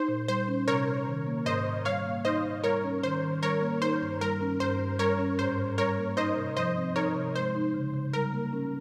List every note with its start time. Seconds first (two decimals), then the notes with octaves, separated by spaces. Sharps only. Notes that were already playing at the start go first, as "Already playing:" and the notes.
Already playing: D#4 C5
0.08 A#2
0.28 G3 C5
0.48 C#4
0.68 C3 A#4 C#5
0.87 C3
1.07 D#3
1.27 A#3
1.46 G#2 C5 D#5
1.65 G#2
1.85 G3 C#5 F5
2.05 A#3
2.25 D#4 C5 D#5
2.44 G#2
2.64 G3 A#4 C#5
2.84 C#4
3.03 D#3 C5
3.23 D#3
3.42 G3 A#4 C#5
3.61 A#3
3.81 D#4 C5
4.02 G2
4.21 G3 A#4
4.41 C#4
4.60 G2 C5
4.80 G2
4.99 G3 A#4 C#5
5.19 C#4
5.39 G#2 C5
5.58 G#2
5.78 G3 A#4 C#5
5.98 A#3
6.17 D#4 C5 D#5
6.37 C3
6.57 F3 C5 D#5
6.76 C4
6.95 D#4 A#4 C#5
7.15 C3
7.35 G#3 C5
7.55 D#4
7.74 C#3
7.93 C#3
8.13 G3 A#4
8.32 A#3
8.53 C#4